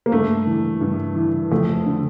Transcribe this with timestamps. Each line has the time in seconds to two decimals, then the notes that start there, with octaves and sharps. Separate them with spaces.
0.06 A#3
0.12 G2 A3
0.47 E3
0.81 G2
1.16 E3
1.51 F2 A3
1.86 D3